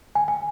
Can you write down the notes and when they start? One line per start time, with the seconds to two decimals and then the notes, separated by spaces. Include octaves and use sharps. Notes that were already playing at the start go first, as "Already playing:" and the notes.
0.15 G#5
0.28 G#5